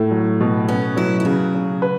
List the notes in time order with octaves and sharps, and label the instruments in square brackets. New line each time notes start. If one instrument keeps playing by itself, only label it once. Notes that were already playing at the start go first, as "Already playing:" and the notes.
Already playing: [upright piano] A2 [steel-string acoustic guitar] A3
[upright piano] F#3
B2
[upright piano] B3 [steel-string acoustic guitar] C#4
[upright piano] F#3 [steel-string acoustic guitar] E4
[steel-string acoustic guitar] E4
[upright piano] C#3 [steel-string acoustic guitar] F#4
[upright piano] C#3
B4